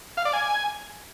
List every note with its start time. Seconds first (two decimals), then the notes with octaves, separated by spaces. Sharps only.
0.17 F5
0.25 D5
0.33 G#5